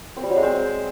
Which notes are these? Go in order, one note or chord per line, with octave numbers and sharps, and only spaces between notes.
C4
G3
F#3
G#3
C4